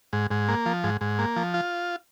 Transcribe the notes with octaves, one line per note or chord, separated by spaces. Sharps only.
G#2
G#2
A#3
F3
G#2
G#2
A#3
F3
F4